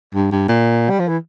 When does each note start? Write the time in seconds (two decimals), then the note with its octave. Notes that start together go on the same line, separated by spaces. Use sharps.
0.14 G2
0.32 G2
0.48 A#2
0.90 G3
0.99 F3
1.08 E3